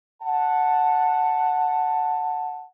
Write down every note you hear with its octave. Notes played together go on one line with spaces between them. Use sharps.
F#5 A5